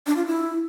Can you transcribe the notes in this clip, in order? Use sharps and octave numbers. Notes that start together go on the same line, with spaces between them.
D4
F4
E4